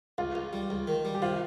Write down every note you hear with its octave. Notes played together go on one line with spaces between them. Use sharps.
C#2 F4
C#2
G3
C#2
D#3
G3
G4
C3 F4